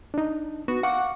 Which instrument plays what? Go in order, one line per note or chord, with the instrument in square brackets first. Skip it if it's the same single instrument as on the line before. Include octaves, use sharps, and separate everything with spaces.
[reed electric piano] D4 D#4
[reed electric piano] B3 [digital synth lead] F#4
[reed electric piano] F5 C#6 D6 [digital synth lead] F#5